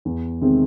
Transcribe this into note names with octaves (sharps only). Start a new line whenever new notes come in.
E2
C3 D#3 G#3 C4